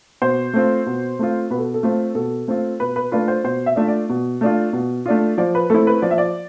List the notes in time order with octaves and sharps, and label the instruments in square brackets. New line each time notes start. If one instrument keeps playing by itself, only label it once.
[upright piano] B2 C5
A3 C4 F4
B2
A3 C4 F4
B2 B4
A4
A4
A3 C4 F4
B2 A4
A3 C4 F4
B2 B4
B4
A3 D4 F4 B4
C5
B2 C5
E5
A3 D4 F4
D5
B2
A3 D4 F4
B2
A3 D4 F4
F3 D5
B4
A3 C4 E4 A4
B4
F3 D5
E5
D5